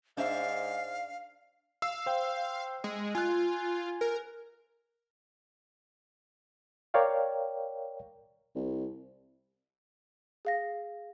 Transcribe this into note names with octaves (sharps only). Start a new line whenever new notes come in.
G#2 D4 C5 E5 F5
F5 E6
C5 G5
G#3
F4 G#5 F#6
A#4
A#4 C#5 D5 F5 G5
C2
G#4 F5 A#6